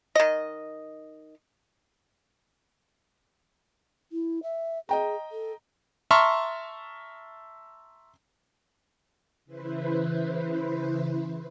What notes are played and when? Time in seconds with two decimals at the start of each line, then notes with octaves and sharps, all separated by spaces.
0.15 D#3 D#5
4.12 E4
4.43 E5
4.89 G#4 D#5 G5 A#5
5.32 A4
6.11 E5 A5 A#5 C6 C#6 F6
9.45 C#3 E3 E4 B4 C5